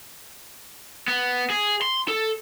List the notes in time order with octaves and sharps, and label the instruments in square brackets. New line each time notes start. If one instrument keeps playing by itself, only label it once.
[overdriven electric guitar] B3
G#4
C6
A4